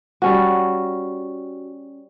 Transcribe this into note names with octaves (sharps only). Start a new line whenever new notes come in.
G3 C#4 F#4